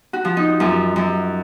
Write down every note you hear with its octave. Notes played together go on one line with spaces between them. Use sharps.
F#4
F3
D#4
F#2 F4
F#2